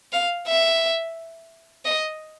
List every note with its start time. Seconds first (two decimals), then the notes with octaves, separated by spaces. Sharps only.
0.12 F5
0.47 E5
1.85 D#5